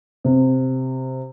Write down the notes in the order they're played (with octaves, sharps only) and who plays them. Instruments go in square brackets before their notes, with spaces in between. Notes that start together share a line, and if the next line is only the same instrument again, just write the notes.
[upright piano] C3